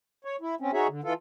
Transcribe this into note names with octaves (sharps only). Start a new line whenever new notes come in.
C#5
E4
C4 C#4
D#4 F#4 G#4 C#5 E5
D3
E3 F4 A4